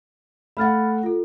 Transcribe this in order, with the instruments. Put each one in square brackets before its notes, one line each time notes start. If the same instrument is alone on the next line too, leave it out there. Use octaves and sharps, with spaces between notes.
[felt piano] A3 F5 F#5 [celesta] B5 F6 A6
[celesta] F4 A4